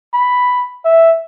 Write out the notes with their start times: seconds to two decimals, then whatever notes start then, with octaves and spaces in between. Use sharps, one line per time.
0.14 B5
0.85 E5